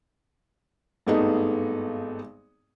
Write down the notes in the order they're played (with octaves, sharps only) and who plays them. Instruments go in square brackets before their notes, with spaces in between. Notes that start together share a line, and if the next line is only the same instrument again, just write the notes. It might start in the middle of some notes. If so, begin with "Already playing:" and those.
[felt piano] G#1 G2 A3 B3 D#4 G#4